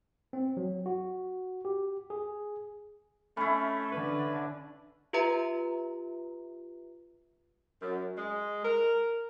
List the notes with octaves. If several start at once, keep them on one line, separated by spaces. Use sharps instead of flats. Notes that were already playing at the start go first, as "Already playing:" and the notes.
C4
F#3
F#4
G4
G#4
A3 C#4 E4 B5
D3 D4 B4
F4 G4 B4 E5 A#5
F#2
G#3
A#4